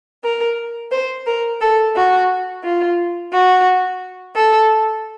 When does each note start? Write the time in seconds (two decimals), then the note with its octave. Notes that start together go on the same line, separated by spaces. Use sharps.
0.23 A#4
0.91 C5
1.26 A#4
1.60 A4
1.95 F#4
2.64 F4
3.32 F#4
4.35 A4